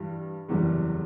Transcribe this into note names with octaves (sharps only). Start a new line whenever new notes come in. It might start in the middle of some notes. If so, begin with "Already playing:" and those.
Already playing: G2 E3 G3
F#1 E2 C3 E3 G3